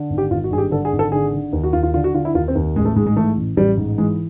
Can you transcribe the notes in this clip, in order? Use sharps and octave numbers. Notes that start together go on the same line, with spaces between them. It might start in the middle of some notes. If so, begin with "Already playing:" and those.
Already playing: D3
G#1
G4
G#1 F4
F#4
G2 G#4
G4
D3 A4
G#4
G#1
A4
D3 G#4
D3
D#2
F#4
D#2 F4
F4
D3 F4
F#4
D3 F4
E4
D#2 F4
C4
D#2
A1 G#3
A3
G#2 G#3
G#3
E3 A3
A1
A1 G3
G#2
E3 G#3